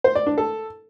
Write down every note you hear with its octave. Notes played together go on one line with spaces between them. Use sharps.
C5
D5
D4
A4